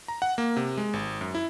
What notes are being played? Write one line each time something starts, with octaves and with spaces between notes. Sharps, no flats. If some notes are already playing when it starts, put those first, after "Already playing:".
A#5
F#5
A#3
C3
G#3
G#1
F#2
E4